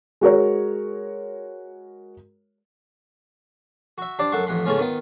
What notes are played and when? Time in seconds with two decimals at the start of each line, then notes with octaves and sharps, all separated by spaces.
0.21 G#3 F#4 A#4 C#5
3.98 F#4 E5
4.19 D4 G4 C5 D5
4.32 F#2 A4 F#5 C6 C#6
4.46 A1 F2 F#5 B5 C6
4.65 G#2 C#3 A3 B3 C#4 F4
4.79 D#3 B3 F4